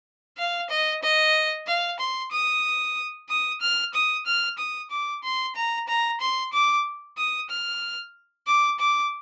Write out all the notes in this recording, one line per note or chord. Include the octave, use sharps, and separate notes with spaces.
F5
D#5
D#5
F5
C6
D#6
D#6
F6
D#6
F6
D#6
D6
C6
A#5
A#5
C6
D6
D#6
F6
D6
D6